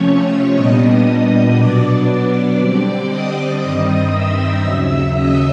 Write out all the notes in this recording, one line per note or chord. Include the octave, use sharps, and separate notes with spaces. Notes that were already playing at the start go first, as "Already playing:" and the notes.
Already playing: C3 F3 A3 C#4 C#5 C#6
A#2 G3 B3 D4 D#5 D#6
D#5 D#6
B2 F#3 B3 D4 D5 D6
D3 G3 C4
D#5 D#6
G2 D#3 G3 C4 D#5 D#6
E5 E6
D#2 C#3 F#3 E5 E6
D#5 D#6